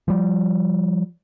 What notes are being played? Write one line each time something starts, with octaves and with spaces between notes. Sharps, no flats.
F3 G3